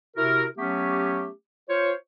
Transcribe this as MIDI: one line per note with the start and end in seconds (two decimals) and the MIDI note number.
0.17 0.44 48
0.17 0.44 64
0.17 0.44 66
0.17 0.44 70
0.58 1.29 54
0.58 1.29 57
0.58 1.29 59
0.58 1.29 61
0.58 1.29 67
1.70 1.93 65
1.70 1.93 72
1.70 1.93 73